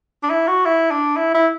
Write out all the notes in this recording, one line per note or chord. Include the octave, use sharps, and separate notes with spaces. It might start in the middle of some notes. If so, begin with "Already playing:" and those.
D4
E4
F#4
E4
D4
E4
E4